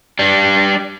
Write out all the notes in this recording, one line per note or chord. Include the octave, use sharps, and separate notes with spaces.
G3 D4